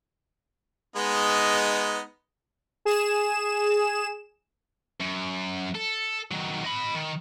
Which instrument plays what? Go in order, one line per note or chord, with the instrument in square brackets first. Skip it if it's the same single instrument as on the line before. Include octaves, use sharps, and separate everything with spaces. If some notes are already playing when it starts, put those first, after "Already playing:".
[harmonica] G#3 B3 D#4
[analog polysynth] G#4 E7
[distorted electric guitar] F#2
A4
D#3 F#3
D#5 B5
D#3